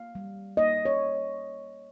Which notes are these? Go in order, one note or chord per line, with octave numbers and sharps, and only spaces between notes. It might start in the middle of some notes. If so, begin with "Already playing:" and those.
Already playing: A#3 F5
G3
A#3 D#5
C#5